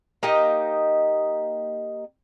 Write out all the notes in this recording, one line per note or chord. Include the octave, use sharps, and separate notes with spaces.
A#3 D#4 G4 D#5